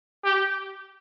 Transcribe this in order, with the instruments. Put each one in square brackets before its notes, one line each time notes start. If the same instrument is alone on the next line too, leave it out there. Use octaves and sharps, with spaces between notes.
[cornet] G4